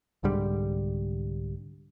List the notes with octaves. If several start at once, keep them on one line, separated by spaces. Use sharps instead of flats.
C2 G#2 D3 G3